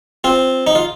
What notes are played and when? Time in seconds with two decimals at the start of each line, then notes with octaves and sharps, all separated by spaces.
0.24 C4 F4
0.67 D#4
0.75 F4